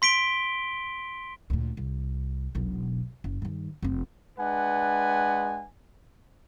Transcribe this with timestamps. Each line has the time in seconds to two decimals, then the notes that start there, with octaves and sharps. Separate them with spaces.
0.02 C6 B6 D7 G7
1.50 D2 A#2
1.77 C2
2.55 E1 B1
3.24 F#1
3.42 G2 D#3
3.83 F1 C4
4.39 G#3 D4 B4 F#5 G#5